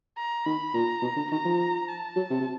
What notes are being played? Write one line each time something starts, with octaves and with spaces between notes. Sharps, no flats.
A#5
D#3 B5
A#2 A#5
B2
D3
D#3 A#5
F3
A5
F#3
C3
C3